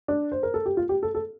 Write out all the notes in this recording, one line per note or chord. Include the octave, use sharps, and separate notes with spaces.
D4
C5
A#4
A4
G4
F4
G4
A4
A4